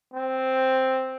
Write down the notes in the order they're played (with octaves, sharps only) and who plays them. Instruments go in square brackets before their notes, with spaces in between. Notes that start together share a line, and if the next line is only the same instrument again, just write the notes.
[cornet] C4